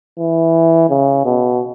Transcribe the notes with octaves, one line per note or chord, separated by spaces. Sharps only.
E3
C#3
B2